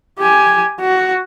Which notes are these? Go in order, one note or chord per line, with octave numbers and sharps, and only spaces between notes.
G4 G#5
F#4